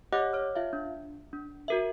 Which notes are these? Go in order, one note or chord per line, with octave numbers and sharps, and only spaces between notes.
G4 C#5 D#5 F#5 D6 F#6
C#5 F6
F4 E5 F5
D4
D4
F#4 A#4 E5